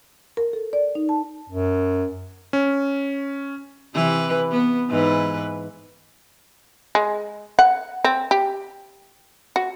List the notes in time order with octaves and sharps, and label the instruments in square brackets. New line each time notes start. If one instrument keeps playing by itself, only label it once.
[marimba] A#4
A4
D5
D#4
A5
[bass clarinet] F#2
[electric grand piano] C#4
[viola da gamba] C3 E3 B4
B3
G#2 E3 B4
[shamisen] G#3
F#5
C4
G4
F#4